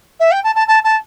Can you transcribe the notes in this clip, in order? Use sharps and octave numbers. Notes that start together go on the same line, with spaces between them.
E5
G5
A5
A5
A5
A5